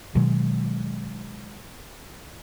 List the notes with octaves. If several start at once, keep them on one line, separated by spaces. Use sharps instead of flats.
B2 D#3 F#3 G#3